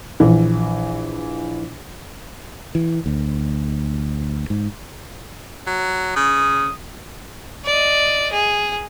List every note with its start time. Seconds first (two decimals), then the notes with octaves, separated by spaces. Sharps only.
0.20 A#1 E3
2.75 E3
3.06 D2
4.50 G#2
5.67 F#3
6.16 C#3 D#6
7.64 D5 D#5
8.32 G#4